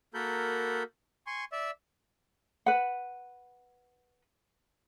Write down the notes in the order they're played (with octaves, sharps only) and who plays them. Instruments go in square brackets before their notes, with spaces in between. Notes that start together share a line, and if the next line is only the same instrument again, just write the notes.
[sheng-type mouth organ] A#3 F#4 A4 A#4 B5 G6
G#5 C6 C#6
D5 E5 E6
[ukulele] B4 F#5